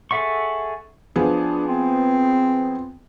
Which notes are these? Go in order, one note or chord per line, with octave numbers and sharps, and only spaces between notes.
G#4 A4 E5 F#5 C#6
F3 B3 D4 G#4
C4